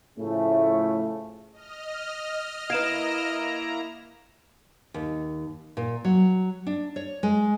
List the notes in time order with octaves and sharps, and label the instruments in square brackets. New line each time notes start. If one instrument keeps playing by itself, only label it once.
[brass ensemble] A2 C#3 F3 A3
[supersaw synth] D#5 F6
[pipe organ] A#3 E4 A#5 [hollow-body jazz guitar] B4 F5 [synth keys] G#6 D7 E7
[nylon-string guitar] D#2
A#2
F#3
D4
C#5
G#3